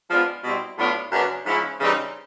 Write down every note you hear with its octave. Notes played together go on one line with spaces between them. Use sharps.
F3 G#3 B3 D4 F4
B2 G3 C4 E4
A2 F#3 B3 D4 F4
F#2 C#3 F#3 B3 D4
G#2 F3 G#3 C#4 E4
C#3 E3 G3 C4 D#4